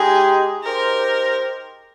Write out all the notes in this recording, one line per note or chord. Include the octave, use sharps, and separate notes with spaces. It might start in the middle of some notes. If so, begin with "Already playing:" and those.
Already playing: G#3 D#4 G4 G#4
D#4 G4 A#4 C5